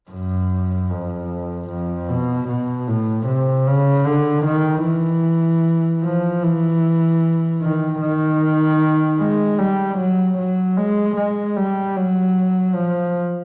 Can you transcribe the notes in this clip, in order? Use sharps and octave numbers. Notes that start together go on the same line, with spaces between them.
F#2
F2
F2
B2
B2
A2
C3
C#3
D3
D#3
E3
F3
E3
D#3
D#3
G#3
G3
F#3
F#3
G#3
G#3
G3
F#3
F3